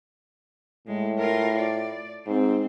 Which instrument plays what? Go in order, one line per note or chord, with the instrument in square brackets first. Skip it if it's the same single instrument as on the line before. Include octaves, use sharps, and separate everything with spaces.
[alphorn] A2 [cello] G#3
[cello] F4 A#4
D5
[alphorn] G#2 [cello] C4